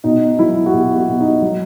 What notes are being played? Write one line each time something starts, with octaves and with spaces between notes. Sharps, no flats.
B2 D#4
F#3 E4
F#4
B2 G4
F#4
B2
D#4
F#3